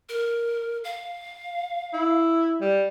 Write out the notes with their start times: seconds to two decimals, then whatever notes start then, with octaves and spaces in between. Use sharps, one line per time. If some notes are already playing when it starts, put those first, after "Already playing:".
0.09 A#4
0.84 F5
1.93 E4
2.61 G3